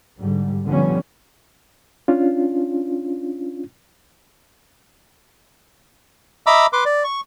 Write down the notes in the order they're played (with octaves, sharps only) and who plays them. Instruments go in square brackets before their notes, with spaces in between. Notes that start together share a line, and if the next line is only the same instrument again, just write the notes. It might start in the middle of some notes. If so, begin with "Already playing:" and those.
[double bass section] G#2 D3 G3
D3 F3 G3 B3 C#4
[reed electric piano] C#4 D4 F4
[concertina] D#5 E5 A#5 B5 D6 E6
B4 C6 D6
D5
C#6